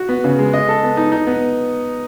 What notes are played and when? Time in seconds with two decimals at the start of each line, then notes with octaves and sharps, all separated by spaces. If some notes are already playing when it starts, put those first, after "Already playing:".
Already playing: F#4
0.09 B3
0.24 C#3
0.39 G#3
0.53 D#5
0.68 A4
0.83 B3
0.97 D#4
1.12 D#4
1.27 B3